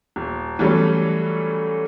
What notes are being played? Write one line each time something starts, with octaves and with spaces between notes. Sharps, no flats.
D#1
E3 F#3 G3 A3 C#4